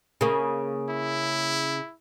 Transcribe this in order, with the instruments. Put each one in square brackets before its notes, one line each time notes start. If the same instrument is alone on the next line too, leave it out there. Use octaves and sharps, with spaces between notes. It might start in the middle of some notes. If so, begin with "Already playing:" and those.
[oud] C#3 A#3
[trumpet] E4